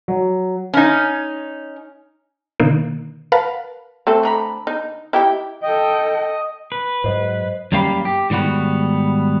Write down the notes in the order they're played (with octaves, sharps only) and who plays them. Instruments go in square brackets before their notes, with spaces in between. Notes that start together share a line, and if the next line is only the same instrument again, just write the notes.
[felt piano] F#3
[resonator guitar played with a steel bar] C#4 D#4
[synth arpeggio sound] B2 D3 D#3 A#3
A#4 B4 F5 F#5 A5
[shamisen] A3 C4 A4
[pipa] D3 A#5 B5
[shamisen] D#4
[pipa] D#4 G5 [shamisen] E4 G4
[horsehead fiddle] A4 G5 [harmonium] D#5
[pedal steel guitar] B4
[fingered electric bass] G#2 F#3 [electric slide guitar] C5 D#5
[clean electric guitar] F#2 G3 A#3 G4 F5 B5
G4
G#2 D#3 G3 B3 F#4